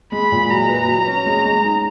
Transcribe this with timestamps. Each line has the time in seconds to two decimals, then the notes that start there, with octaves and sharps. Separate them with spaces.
0.12 G#3 B5
0.32 A#2
0.50 F#3 A#5
0.69 B4
0.88 F#3
1.07 C#4
1.26 G#3
1.45 G#3
1.64 D#4